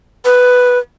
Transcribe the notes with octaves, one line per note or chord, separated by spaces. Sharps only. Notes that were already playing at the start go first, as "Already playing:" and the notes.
B4